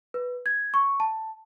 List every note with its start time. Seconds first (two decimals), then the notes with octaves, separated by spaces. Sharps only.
0.14 B4
0.46 G#6
0.74 C#6
1.00 A5